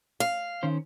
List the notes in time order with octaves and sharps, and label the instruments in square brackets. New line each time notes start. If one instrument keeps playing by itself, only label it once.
[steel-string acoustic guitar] F5
[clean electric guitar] D#3 C#4 C5